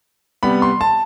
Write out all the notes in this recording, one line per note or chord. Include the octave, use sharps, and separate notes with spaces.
C3 G3 B3 B5
C6
A5